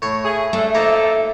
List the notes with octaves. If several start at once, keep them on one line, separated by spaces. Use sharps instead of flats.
A2 C#5
G#4 E5
A3 D4 A4
F3 A#3 D#4 A4 A#4